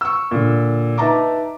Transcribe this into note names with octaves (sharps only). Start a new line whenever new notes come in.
C#6 E6
A#2 D3
D#4 B4 E5 A5 A#5 D6